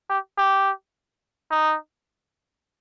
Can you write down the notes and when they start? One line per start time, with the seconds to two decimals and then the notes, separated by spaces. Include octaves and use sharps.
0.10 G4
0.38 G4
1.51 D#4